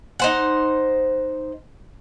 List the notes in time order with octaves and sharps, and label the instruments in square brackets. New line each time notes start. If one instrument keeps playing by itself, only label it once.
[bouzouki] D#4 C5 F#5